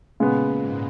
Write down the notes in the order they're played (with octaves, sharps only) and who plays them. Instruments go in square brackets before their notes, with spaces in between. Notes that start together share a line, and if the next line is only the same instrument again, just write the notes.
[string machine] A#2 [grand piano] C#3 G#3 B3
[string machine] G#2